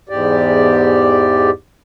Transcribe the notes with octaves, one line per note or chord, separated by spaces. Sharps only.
E2 G#2 G4 D5